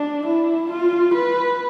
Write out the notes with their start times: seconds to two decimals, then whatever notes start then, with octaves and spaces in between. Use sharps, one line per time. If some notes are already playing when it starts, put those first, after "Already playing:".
Already playing: D4
0.26 E4
0.70 F4
1.14 B4